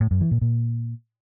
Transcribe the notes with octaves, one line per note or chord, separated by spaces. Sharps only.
A2
F#2
E3
A#2
A#2